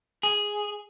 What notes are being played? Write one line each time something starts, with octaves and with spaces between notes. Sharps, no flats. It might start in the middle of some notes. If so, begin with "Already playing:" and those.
G#4